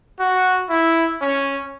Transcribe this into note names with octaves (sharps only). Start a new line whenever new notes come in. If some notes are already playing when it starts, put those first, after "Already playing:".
F#4
E4
C#4